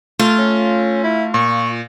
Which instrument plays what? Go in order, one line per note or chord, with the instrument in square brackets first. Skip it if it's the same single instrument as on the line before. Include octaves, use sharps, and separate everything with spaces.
[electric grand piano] A3 [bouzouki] F4
[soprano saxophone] C#4
E4
[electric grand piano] A#2 [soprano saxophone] C#6